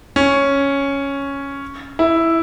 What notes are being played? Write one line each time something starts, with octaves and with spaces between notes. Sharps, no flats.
C#4
E4